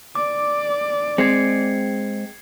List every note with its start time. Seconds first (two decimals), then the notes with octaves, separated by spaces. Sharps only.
0.15 D5 D6
1.18 G#3 C4 G#6 C7 C#7